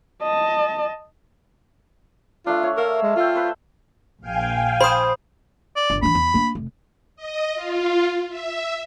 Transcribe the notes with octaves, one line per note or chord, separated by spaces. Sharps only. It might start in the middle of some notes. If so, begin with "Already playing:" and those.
D#5 A5
A3 D4 F4
C#5
A#4 E5 F5
G#3
F4 A4 G5
B4 C5
A#1 F5 G5 G#5
C5 B5 D#6
D5
G1
E3 D4 B5
E2
A#3 D4
F1
D#5
F4
E5